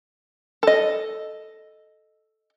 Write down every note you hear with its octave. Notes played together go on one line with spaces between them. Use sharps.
A4 D#5